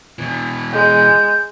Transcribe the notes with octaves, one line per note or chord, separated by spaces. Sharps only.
B2 E3
G#3 G6